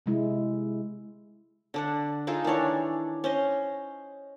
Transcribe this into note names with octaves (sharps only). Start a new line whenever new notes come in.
C3 G#3 E4
D3 D4 F#5
D#4 F4 G#4 A4
D#3 E3 D4 C#5
C#4 C5 D#5